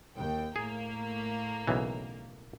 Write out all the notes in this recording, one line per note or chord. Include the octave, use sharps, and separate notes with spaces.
D#2 G5
A2 A3 A#3 G#4
B1 C#3 E3